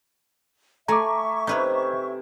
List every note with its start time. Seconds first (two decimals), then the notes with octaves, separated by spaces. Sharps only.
0.88 A3 E5 G#5 A#5 C#6 D6
1.47 C3 D#4 E4 B4 C#5